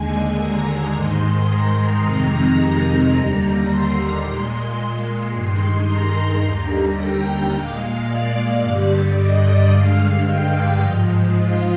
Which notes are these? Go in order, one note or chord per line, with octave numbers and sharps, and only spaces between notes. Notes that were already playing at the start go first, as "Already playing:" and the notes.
Already playing: D#2 D3 G#3 G#5
A#5
G#2 D#3 G#3 C6
A#5
F2 C3 D#3 G#3
D#2 D3 G3 A#5
C6
A#2 G#3
C6
G2 D#3 G#3
A#5
D#2 D3 G3
G5
A#2 G#3 F5
D5
G2 D3 G3
D#5
G2 D3 G#3 F5
G5
G#2 F3 G#3
F4